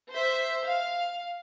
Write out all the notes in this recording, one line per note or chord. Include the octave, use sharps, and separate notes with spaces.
C5 E5
F5